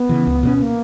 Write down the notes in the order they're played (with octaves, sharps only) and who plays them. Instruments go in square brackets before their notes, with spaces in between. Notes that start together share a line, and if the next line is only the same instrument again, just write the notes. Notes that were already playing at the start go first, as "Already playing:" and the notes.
Already playing: [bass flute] B3
[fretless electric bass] C#3 E3
C#2
B2 G#3 C#4
[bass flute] A#3